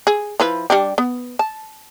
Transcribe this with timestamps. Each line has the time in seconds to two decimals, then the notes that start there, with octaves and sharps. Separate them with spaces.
0.07 G#4
0.40 F3 E4 B4
0.70 G3 D4 G4
0.98 B3
1.39 A5